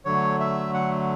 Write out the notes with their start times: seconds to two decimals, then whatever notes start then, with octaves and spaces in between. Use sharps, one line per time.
0.05 D3 F#3 A3 C#5
0.40 E5
0.74 F#5